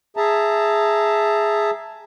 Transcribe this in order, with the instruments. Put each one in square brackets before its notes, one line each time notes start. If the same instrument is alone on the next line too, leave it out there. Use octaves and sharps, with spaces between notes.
[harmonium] G#4 E5 A5 A#5